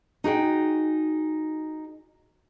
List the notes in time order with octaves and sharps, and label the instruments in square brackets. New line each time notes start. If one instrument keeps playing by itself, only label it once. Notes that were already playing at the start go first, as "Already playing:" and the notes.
[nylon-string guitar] D#4 F#4 G#4 G5